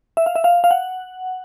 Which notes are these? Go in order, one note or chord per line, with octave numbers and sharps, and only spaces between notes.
E5
F5
E5
F5
F5
F#5